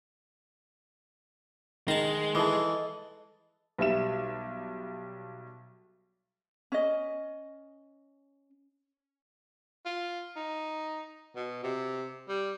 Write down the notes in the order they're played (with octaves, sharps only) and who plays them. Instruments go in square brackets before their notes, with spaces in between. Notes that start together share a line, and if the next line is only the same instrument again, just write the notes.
[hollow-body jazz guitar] D#3 [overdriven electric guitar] G#3 [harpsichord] A5 A#5
[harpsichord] E3 [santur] A4 D#5
[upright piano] B1 G3 E5 E7
[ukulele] C#4 D#5
[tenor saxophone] F4
D#4
B2
C3
G3